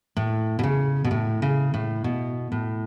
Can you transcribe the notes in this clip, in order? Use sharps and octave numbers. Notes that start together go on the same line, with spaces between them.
A2
B2
C#3
B2
A2
C#3
A2
B2
A2